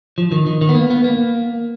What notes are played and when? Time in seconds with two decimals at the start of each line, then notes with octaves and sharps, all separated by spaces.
0.18 F3
0.32 D#3
0.47 D#3
0.61 D#3
0.69 B3
0.75 A#3
0.90 B3
1.04 A#3